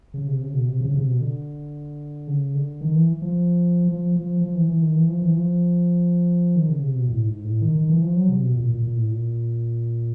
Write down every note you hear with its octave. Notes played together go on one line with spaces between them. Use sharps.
C#3
C3
C#3
B2
C3
C#3
C3
B2
D3
C#3
D3
D#3
E3
F3
F3
F3
F3
E3
E3
D#3
E3
F3
E3
F3
D#3
C#3
C3
B2
A2
G#2
A2
D#3
D#3
E3
F3
F#3
C3
B2
A#2
A#2
A#2
A2
A#2